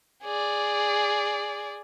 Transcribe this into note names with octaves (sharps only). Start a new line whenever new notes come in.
G#4 D5